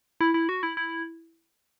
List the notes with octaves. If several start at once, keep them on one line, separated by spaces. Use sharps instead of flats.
E4
E4
F#4
E4
E4